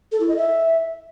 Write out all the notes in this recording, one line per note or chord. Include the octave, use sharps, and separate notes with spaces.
A4
E4
D#5
E5